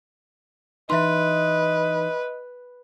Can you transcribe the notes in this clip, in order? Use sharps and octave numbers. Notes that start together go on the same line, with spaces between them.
E3 D#4 B4 D#5 E5 C6